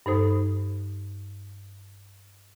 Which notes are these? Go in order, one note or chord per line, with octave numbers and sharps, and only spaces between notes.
G2 D#4 A4 C5 D#6